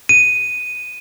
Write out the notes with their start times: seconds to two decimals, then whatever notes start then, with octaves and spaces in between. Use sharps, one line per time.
0.09 D#7